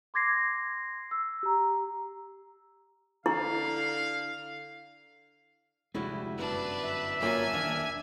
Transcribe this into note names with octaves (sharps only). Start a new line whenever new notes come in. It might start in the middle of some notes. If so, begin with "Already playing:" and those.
C6 D6 G#6 A#6 C7
E6
G4 A#5
D3 E4 F5
F1 D2 G3 G#3 E4 F#4
G1 F#2 D4 B4
E5
F#3 A#3 F4 G#5
D#1 D4 F5